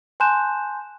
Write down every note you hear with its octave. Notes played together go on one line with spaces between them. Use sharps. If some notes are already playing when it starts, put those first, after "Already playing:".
G#5 A5 C6 F#6 G6 E7